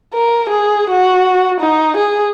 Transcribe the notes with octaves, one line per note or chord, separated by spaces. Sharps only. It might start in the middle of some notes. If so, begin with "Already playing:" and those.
A#4
G#4
F#4
D#4
G#4